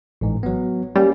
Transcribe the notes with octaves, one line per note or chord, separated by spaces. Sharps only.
A1 G#2
F#3 B3
G3 A#3 C#4